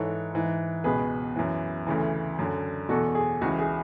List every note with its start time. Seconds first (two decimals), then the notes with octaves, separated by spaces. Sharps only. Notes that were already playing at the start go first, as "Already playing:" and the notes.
Already playing: G#2 E3 A4 C#5
0.34 G#2 E3
0.84 C#2 B2 G#4 B4
1.36 F#2 E3
1.87 D2 C#3 E3
2.39 F#2 D3
2.89 E2 B2 F#4 A4
3.15 G#4
3.41 C#2 C#3 E3 F#4
3.59 G#4